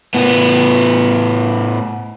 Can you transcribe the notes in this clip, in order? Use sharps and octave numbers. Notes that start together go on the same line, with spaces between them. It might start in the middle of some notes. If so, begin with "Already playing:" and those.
A2 B3